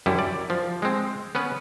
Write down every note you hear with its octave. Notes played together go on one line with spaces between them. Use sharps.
F#2 G3 E4
D5
F3
G#3 C4
B3 C#4 B4